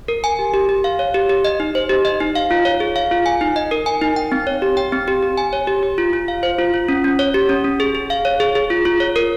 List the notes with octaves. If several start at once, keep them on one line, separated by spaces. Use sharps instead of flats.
A#4
G#5
G4
G4
G4
F5
C#5
G4
G4
D#5
D#4
C5
G4
D#5
D#4
F5
F4
C#5
G#4
F5
F4
G#5
D#4
D#5
A#4
G#5
D#4
G5
C4
C#5
G4
G5
C4
G4
G4
G#5
C#5
G4
G4
F4
F4
F5
C5
F4
F4
C#4
C#4
C#5
G4
C#4
C#4
G#4
G#4
F5
C#5
G#4
G#4
F4
F4
C#5
A#4